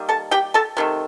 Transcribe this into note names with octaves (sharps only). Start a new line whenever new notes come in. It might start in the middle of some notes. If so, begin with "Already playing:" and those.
Already playing: D#3 G3 A#3
A4 A5
G4 G5
A4 A5
C3 D#3 A3